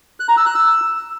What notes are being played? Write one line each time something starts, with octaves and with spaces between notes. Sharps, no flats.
F#6
A#5
E6
F#6
E6